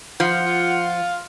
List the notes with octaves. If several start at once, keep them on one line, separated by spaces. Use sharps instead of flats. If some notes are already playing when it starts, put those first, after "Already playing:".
F3 F4 F#5
F4